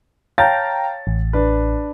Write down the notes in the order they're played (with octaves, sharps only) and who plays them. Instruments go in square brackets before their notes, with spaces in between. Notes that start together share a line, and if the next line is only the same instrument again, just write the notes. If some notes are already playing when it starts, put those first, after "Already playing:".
[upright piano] C#5 A5 A6 [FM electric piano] F5 G5 A#5
[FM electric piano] A1
[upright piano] D4 B4